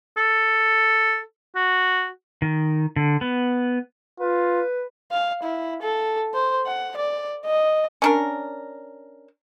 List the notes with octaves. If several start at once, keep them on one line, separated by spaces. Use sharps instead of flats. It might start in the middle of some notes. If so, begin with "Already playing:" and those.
A4
F#4
D#3
D3
B3
F4 B4
F5
E4
A4
C5
F#5
D5
D#5
C#4 D4 A#4